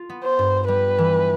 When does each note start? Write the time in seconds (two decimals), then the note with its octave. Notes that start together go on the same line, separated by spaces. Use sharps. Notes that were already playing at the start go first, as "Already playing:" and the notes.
Already playing: F4
0.10 B3
0.24 C5
0.39 G2
0.68 G3 B4
0.98 E3